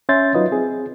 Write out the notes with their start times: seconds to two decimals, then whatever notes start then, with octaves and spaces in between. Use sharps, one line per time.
0.09 C#4 C#5 E5 C6 G6 A6
0.35 F#3 D#4 F4 B4 D#5
0.52 C4 G#4